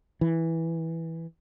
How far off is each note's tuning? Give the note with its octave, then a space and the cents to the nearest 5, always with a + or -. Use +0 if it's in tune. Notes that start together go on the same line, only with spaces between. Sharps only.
E3 -5